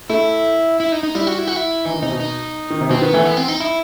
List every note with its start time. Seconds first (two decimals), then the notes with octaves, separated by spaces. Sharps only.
0.10 A3 E4
0.80 E4
0.92 D#4
1.03 D#4
1.15 G3 E4
1.27 F#4
1.38 E4
1.48 F#4
1.56 E4
1.85 E3 D#4
1.94 D#3
2.02 C3 D#4
2.12 B2
2.20 D#4
2.70 D#3
2.81 C3
2.90 B2 C4
3.01 D#3 B3
3.13 E3 A3
3.25 B3
3.37 C4
3.48 D#4
3.60 E4